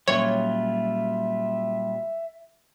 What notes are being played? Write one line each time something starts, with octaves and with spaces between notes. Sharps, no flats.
A#2 F#3 G3 C#4 F4 C#5 E5